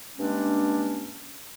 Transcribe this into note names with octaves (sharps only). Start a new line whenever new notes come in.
G2 G#3 A#3 C#4 D4